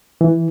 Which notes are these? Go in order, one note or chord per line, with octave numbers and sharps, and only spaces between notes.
E3